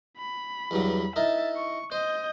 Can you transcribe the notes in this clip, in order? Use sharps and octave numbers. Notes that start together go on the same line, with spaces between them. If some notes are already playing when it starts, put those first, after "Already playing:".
B5
E2 G2 F#3
D#4 E4 A#4 E5 A6
C#6
C5 D#5 G6